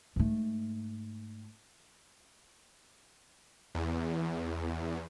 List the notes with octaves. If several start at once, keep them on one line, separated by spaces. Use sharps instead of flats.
G#2 A3
E2